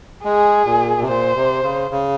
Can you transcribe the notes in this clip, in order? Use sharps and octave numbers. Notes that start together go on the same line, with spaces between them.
G#3 G#4
A#2
C3
A#2 C5
C3
C#3
C#3